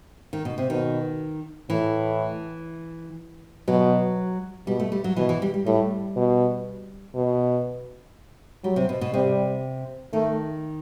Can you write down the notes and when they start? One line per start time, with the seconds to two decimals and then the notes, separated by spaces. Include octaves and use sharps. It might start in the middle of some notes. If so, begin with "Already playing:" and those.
0.33 D#3
0.45 B2
0.58 C3
0.70 B2 D#3
1.70 A2 E3
3.68 B2 F#3
4.67 B2 G3
4.80 A3
4.92 G3
5.04 F#3
5.16 B2 E3
5.29 E3
5.42 G3
5.54 G3
5.66 A2 G3
6.17 B2
7.15 B2
8.64 F#3 G3
8.76 C3
8.89 B2
9.01 B2
9.13 C3 G3
10.13 D#3 A3